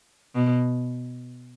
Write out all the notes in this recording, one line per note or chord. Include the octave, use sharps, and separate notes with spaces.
B2